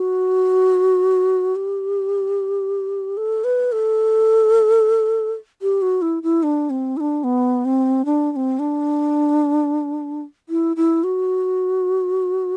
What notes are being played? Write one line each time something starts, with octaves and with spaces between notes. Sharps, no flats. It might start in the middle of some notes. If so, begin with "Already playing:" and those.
Already playing: F#4
G4
A4
B4
A4
G4
F#4
E4
E4
D4
C4
E4
D4
B3
C4
D4
D4
C4
D4
E4
E4
F#4